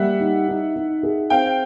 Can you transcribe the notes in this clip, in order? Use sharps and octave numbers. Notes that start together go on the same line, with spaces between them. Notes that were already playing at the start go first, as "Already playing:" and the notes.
Already playing: G3 A#3 E5 F#5
D#4
D#4
D#4
G#4
C4 F5 G5